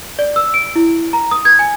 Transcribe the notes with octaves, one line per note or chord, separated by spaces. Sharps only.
D5
E6
D7
E4
A#5
D#6
G#6
G#5